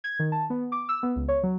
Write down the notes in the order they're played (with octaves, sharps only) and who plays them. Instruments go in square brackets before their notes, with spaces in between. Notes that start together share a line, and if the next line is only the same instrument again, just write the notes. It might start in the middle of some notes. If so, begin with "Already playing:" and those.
[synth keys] G#6
D#3
A5
B3
D6
E6
B3
C#2
C#5
F#3